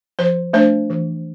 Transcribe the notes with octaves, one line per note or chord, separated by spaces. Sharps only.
F3 C5
A3 D4 C5
E3